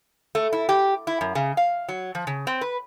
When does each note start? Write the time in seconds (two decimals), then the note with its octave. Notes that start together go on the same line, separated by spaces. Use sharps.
0.35 A3
0.52 E4
0.69 G4
1.07 E4
1.21 F#2
1.35 C#3
1.57 F5
1.89 F#3
2.15 F3
2.27 C#3
2.47 C4
2.61 B4